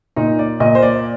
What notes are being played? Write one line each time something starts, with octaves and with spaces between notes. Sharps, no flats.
A#2 D#4
D5
A#2 D#5
C5
D5